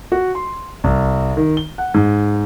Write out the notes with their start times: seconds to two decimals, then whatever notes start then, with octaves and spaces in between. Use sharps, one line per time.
0.12 F#4
0.35 C6
0.84 C2
1.37 D#3
1.57 G7
1.78 F#5
1.94 G#2